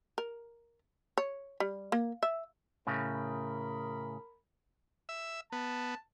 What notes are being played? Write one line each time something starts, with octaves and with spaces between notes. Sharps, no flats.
A#4
C#5
G3
A#3
E5
A2 C#3 A#4 B5
E5
B3 A5